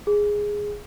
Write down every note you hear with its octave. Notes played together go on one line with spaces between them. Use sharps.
G#4